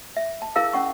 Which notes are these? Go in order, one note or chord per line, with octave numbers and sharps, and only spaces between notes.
E5
A5
E4 G#4 A#4 F5 E6
C#4 F#5 C#6